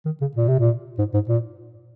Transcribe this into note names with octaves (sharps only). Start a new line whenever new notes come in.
D#3
C#3
A#2
C3
A#2
G#2
G#2
A#2